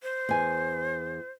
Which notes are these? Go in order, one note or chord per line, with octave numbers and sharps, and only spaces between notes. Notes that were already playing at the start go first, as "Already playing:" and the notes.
C5
E2 G#5